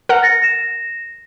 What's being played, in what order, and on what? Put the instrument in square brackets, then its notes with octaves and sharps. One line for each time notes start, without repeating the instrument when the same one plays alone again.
[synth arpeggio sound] A#4 F#5
[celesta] A6 A#6 C#7
A#6 E7